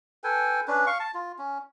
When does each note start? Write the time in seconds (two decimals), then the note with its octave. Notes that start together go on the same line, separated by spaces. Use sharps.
0.24 A4 B4 G5 G#5
0.67 C#4 D4 B4
0.87 F5 C#6
1.00 A5
1.14 F4
1.38 C#4